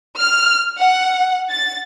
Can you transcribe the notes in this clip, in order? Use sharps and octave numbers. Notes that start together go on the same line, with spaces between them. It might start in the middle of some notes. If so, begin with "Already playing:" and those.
F6
F#5
A6